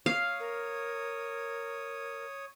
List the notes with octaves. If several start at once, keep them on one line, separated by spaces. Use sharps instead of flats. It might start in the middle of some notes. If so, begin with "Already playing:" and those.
C#5 F5 D#6
A#4